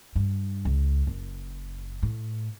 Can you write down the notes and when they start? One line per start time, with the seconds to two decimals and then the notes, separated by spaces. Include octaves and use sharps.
0.15 G2
0.65 C#2
1.07 F#1
2.03 A2